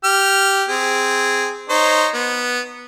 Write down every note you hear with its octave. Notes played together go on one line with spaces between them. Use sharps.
G4 F6
C4 G#4
D#4 C5 C#5
B3